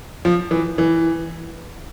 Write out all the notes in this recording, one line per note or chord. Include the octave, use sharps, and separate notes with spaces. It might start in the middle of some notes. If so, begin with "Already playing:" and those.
F3
E3
E3